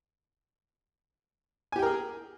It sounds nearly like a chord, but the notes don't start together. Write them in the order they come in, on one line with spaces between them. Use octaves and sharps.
G#5 G4 G5 A#4 G#4